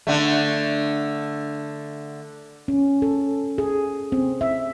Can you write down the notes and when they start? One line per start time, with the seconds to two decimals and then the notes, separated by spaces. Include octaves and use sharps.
0.07 D3 A3
2.68 C#4
3.02 A4
3.58 G#4
4.12 C4
4.41 E5